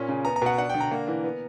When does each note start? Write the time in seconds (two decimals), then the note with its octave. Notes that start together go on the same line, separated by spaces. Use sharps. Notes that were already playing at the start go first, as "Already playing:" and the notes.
Already playing: A#2 C#4
0.08 C#3
0.25 B3 A#5
0.36 A#5
0.42 B2 F#5
0.58 D4 F#5
0.69 D3 G5
0.81 A#5
0.91 A#3
1.08 E3
1.24 B3